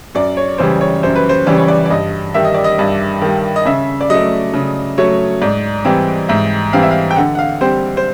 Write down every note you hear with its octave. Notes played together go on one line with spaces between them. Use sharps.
F#2 D5
C#5
C#3 E3 G3 C5
C#5
F#2 C5
B4
C5
C#3 E3 G3 D5
C#5
D5
D5
G2 D#5
D#3 G3 E5
D#5
D5
D#5
G2
D#3 G3
D#5
C#3 E5
D5
F#3 A3 D#5
C#3
F#3 A3 C#5
G#2 D5
E3 G3 C4
G#2 E5
E3 G3 C4 F5
E5
F5
G5
D3 F#5
F#5
F5
G3 C4 C5
C5